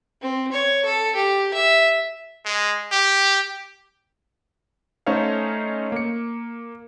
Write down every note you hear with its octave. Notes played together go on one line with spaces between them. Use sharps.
C4
C#5
A4
G4
E5
G#3
G4
A3 C#4 D#4 C5 C#5 F5
A#3 C#7